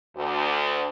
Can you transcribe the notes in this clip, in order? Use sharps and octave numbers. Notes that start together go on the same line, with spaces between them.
D2